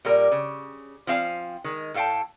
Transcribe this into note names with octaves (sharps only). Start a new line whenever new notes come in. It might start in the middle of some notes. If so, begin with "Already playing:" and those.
A#2 G3 A#4
C#3
F3 C4 F5 G#5
D#3 G#3
A2 A4 F5 G5 A5